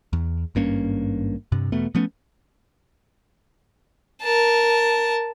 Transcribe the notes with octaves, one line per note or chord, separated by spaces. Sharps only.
E2
G#1 G2 A#3 C#4
G2 C3
E2 B2 A3 B3
F3 A3 B3 C#4
A#4 A5